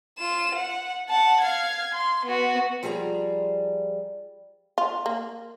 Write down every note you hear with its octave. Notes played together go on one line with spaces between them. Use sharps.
F4 E7
F#5
F#5 A5
F5 G#6
C6
B3 F#4
F3 G3 G#4 G#5 A#5
F4
A#3